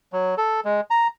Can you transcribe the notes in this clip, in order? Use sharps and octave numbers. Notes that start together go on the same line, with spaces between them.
F#3
A4
G#3
A#5